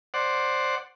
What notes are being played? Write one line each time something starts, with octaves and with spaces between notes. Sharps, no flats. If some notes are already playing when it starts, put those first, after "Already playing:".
C5 D5 F#5